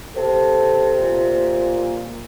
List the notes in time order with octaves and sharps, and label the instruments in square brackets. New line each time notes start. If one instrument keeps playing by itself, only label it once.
[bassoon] C3 [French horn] A4
[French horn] A#2